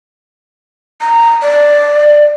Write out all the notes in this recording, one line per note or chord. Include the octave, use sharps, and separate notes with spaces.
A#5
D5